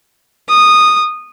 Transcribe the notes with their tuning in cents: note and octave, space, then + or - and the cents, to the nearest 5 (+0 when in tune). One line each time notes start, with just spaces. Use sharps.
D#6 -15